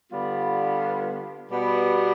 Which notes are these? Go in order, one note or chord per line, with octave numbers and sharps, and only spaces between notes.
D3 G3 B3 F4
B2 G3 B3